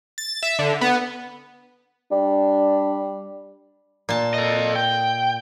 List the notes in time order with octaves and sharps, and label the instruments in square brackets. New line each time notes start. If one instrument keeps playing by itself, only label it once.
[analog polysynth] A6
E5
D3
B3
[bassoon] G3 [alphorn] D4
[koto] A#2 A5
[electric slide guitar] A4 D#5
G5